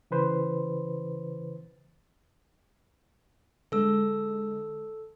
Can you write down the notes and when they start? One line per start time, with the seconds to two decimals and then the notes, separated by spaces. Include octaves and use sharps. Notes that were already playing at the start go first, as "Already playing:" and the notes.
0.11 C#3 E3 B4 C5
3.72 D3 G#3 A4 E6